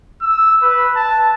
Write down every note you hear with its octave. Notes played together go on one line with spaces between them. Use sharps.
E6
B4
A5